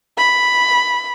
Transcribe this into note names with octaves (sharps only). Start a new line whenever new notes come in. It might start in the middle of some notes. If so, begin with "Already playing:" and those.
B5